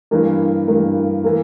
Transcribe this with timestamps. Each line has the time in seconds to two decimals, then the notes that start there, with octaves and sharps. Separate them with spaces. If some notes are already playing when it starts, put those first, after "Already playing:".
0.11 G2 E3 A#3
0.68 G2 E3 A#3
1.24 E3 A#3